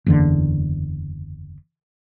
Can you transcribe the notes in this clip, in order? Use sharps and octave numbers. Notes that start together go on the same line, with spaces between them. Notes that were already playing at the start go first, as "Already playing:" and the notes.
F#1 E2 D3